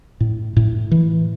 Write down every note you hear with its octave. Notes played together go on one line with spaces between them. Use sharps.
A2
A2
E3